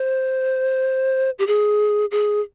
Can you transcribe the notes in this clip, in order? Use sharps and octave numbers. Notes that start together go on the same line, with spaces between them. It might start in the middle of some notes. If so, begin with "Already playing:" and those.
Already playing: C5
G4
G#4
G#4